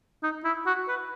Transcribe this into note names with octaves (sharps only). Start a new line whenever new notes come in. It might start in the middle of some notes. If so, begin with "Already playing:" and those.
D#4
E4
F#4
B4